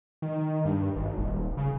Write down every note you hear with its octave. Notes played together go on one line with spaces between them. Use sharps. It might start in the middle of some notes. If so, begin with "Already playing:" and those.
D#3
G2
G#1
D#1
C#3